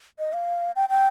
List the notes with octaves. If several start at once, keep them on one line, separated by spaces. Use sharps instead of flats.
D#5
F5
G5
G5